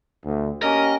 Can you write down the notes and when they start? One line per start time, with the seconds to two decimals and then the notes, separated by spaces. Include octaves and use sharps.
0.25 D2
0.63 A#3 C#4 G4 A#4 D#5